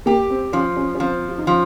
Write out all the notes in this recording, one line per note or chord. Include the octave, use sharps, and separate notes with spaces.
A#3 G4
C4
F3 C#4
C#4
C#4
F3 C4
F4
D#4
F3 C#4